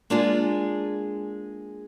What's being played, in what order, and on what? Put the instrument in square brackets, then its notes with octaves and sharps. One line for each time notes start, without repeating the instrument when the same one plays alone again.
[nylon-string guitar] G#3 A#3 D4 F4 G#4